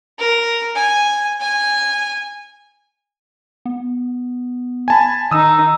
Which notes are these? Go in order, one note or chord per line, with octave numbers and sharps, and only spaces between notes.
A#4
G#5
G#5
B3
G#5 A5 B5
D#3 D#4 D#6 E6